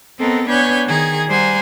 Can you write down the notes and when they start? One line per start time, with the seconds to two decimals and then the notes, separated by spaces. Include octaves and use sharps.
0.19 B3 C4 A4 A#4 D#5
0.48 B3 D4 B4 C#5 G#5 G6
0.87 D#3 G#4 G#6
1.28 G3 C5 F#5 G#5 A#5